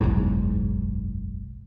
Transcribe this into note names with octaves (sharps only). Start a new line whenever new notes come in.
F#1 B1 E2 G#2